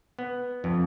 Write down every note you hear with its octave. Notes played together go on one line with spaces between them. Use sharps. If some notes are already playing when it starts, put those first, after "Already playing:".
B3
F2